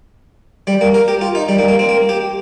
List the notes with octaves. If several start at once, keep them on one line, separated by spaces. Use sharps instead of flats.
G3
A#3
A#4
G4
F4
D#4
G3
A#3
A#3
C4
A#3
G4